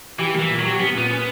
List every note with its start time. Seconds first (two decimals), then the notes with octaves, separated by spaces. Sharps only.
0.19 E3 G4
0.34 A#3
0.39 E3
0.49 A#2
0.59 F#3
0.65 G4
0.80 B3 C#4
0.95 A#2 B3
1.11 C#4